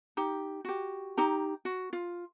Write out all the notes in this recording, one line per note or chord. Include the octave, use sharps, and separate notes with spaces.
D#4 G4
F#4 G4
D#4 G4 A#5
F#4
F4